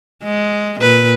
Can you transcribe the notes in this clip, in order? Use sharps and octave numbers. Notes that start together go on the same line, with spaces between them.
G#3
A#2 B4